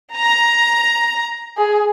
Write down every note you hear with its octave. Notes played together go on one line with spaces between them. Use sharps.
A#5
G#4